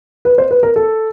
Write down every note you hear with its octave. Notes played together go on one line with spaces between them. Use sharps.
B4
C5
B4
A#4
A4